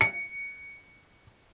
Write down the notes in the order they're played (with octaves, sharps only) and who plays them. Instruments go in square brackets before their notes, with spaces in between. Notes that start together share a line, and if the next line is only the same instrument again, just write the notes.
[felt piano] C#7